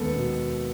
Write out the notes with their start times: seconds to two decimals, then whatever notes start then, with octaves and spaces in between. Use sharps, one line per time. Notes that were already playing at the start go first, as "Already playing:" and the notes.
Already playing: D#2 G#3 B3 A4 B4
0.13 B2